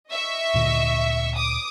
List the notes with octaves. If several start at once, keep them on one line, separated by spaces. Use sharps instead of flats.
D#5 E5 C#6
D2 A#2 D3
D6 D#6